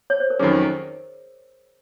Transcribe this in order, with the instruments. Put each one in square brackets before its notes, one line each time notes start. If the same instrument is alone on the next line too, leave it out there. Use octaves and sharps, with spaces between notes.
[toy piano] C#5
C5
A#4
[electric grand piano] F2 D#3 F#3 C#4 [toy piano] G#4